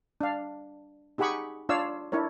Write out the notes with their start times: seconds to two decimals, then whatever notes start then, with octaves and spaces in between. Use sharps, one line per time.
0.21 D4 F5
1.18 D#4 G4 G#4 F#5 B5 C#6
1.69 D4 F4 C#5 D5 F5 E6
2.12 D4 E4 A#4 C#5